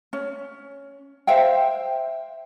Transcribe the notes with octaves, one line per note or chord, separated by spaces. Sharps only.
C#4
C5 E5 F5 G5